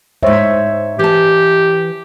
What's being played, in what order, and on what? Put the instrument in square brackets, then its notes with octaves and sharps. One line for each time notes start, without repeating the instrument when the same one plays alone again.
[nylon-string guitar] D#2 G#2 [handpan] C5 C#5 E5
[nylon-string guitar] E3 A5 [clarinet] G4